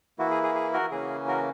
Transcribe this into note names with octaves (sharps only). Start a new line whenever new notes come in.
E3 A#3 E4 F#4
G#4
G#4
G#4
F#4 A#4
C#3 E3 A#3 C#4 G#4
F#4 A#4